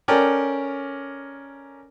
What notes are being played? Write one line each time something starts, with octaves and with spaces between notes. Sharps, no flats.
C#4 A4 A#4 D5 G5